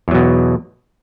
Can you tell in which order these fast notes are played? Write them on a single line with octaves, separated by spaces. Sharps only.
E2 F#3 B2